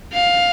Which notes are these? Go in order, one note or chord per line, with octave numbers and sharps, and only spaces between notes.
F5